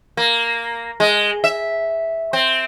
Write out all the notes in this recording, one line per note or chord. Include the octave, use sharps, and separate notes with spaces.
A#3
G#3
E5
C4